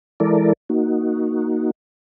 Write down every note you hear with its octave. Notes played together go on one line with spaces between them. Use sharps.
E3 G#3 E4 A4 A#4 D5
A#3 D#4 F#4